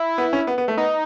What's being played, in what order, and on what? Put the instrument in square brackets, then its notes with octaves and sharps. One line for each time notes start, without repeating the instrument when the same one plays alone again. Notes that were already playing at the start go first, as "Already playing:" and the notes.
Already playing: [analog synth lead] E4
[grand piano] B3
C#4
B3
B3
A3
[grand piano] B3 [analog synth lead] D#4